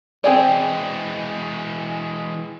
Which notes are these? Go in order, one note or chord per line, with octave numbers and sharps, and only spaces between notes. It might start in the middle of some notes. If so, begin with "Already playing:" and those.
E3 G#3 C4 G#4 D5